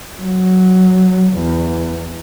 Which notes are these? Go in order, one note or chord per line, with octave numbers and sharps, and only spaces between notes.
F#3
E2